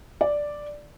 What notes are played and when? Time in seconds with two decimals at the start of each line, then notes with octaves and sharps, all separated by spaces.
0.21 D5